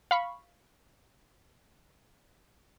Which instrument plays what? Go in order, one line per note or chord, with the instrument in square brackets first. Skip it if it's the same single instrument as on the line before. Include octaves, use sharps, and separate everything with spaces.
[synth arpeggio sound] F5 B5 C#6